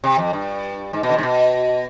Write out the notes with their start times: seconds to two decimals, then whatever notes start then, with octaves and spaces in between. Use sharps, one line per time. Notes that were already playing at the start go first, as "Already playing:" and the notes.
0.04 C3
0.18 F2
0.33 G2
0.93 G#2
1.03 B2
1.09 D3
1.13 C3
1.18 G#2
1.23 B2